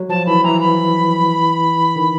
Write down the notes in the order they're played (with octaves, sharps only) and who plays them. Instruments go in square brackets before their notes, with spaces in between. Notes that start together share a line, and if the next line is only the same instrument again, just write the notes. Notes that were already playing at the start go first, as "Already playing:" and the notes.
Already playing: [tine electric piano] F#3
[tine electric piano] F3 [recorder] A5
[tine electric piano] E3 [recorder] B5
[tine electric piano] E3 [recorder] A#5
[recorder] B5
[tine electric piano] D#3